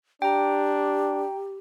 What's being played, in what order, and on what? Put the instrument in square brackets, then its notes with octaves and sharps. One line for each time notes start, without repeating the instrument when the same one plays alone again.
[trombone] D4 [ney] G4 [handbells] G5 A#5